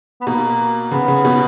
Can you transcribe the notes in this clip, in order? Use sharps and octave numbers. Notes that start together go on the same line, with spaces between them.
B3
B2 A#3
C#3 B3
C#3
B2